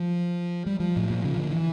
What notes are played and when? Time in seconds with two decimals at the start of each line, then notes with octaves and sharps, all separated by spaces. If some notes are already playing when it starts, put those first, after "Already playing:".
Already playing: F3
0.66 G3
0.80 F3
0.96 A2
1.10 A#2
1.24 C#3
1.37 D3
1.51 E3